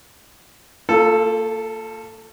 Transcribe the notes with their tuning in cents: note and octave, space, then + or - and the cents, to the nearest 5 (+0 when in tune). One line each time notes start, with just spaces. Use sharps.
A#3 -40 F4 +0 A4 +0